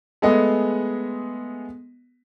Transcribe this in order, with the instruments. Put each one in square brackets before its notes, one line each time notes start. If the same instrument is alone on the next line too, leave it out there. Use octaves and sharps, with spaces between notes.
[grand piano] G#3 A3 B3 G#4 D#5